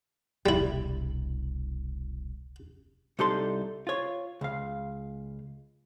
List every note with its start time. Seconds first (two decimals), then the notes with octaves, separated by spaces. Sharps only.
0.46 E1 C2 G3 E4
3.19 C2 D#4 G4 A4 C6
3.87 F4 C#5
4.41 C#2 F5